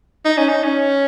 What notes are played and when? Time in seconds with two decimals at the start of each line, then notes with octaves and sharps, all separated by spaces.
0.25 D#4
0.38 C#4
0.49 D#4
0.63 C#4